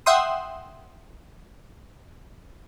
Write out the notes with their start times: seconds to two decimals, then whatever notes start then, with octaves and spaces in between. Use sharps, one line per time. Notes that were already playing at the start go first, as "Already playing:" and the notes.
0.06 E5 F#5 G5 C6 D#6